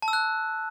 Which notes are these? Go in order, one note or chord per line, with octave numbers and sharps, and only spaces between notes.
A5
E6
F#6